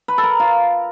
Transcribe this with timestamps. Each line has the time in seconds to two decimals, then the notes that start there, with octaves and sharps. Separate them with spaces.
0.08 B4
0.18 A4
0.23 A#4
0.40 F4